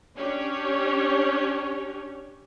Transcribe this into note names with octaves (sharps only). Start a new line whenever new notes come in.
C#4 D4 G4 C#5